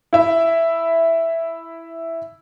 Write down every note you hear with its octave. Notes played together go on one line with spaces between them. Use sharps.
E4 E5